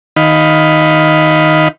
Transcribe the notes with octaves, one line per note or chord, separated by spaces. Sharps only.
D#3 D#4 F5 B5